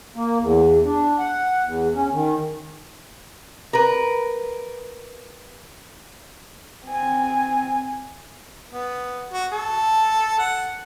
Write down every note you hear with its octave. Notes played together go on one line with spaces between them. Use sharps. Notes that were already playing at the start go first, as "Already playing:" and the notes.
A#3
E2
D4
F#5
E2
C#4
D#3
A#4 B4
C4 G#5
B3
F#4
A4
F#5